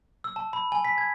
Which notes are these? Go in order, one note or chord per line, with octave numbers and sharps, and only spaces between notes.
E6
A5
B5
G#5
B6
G#6